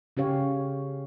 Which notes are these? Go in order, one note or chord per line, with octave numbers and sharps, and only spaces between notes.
C#3 C#4 G4 C#5 F5